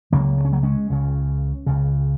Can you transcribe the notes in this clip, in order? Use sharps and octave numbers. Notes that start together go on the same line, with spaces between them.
C#2 C#3 F#3 A#3
A#3
C#4
F#3 A#3
G#3 C#4
C#2 C#3
C#2 C#3